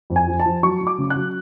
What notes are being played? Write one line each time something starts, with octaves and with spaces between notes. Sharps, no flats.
F2
G#5
F3
A5
F3
F#3 C#6
F#3
D6
C#3
F#6
F#3